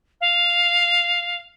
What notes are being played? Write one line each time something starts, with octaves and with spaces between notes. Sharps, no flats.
F5